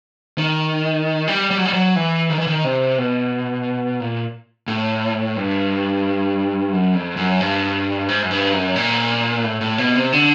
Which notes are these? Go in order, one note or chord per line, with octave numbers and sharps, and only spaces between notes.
D#3
G3
G3
F#3
G3
F#3
E3
D#3
E3
D#3
C3
B2
A#2
A2
G2
F#2
F2
F#2
G2
G#2
F#2
G2
F#2
A#2
A2
A2
B2
C3
D3